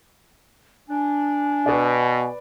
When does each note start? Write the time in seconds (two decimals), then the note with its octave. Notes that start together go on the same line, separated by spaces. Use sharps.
0.89 D4 G#5
1.66 B2 B4 D5